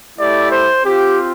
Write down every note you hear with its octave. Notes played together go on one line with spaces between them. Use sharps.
A3 E4 G4 D5
C5
C4 F4 G4